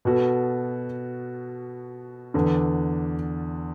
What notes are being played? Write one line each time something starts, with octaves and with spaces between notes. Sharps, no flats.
B2 B3 F#4 A4
E2 D3 B3 D4 A4